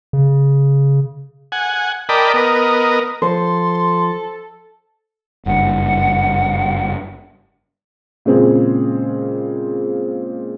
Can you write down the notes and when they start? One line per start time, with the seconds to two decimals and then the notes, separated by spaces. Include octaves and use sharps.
0.13 C#3
1.52 F#5 G#5
2.09 A#4 D5 D#5 G5 A5 B5
2.34 B3 A#4 D#5
3.22 F3 A4 C5 C6
5.46 F#1 G2 F#5
8.25 A#2 C#3 G#3 C4 G#4